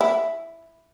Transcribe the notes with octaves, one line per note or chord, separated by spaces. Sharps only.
E4